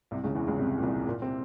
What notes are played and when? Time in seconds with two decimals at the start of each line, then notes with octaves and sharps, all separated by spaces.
0.11 C2 C3
0.24 C#2 C#3
0.35 E2 E3
0.47 C#2 C#3
0.59 C2 C3
0.78 A#2
0.83 C2 C3
1.06 A#2 A#3
1.22 C3 C4